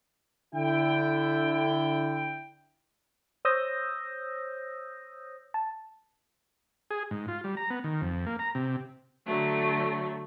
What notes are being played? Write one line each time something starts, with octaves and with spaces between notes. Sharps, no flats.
D3 E4 G5
C5 C#5 D#6 E6 G6 A#6
A5
G#4
G#2
F4
G3
A#5
B3
D#3
F2
A#3
A#5
C3
D3 F#3 A3